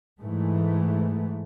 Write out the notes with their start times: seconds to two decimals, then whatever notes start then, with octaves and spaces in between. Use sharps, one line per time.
0.19 G#2 E3 A3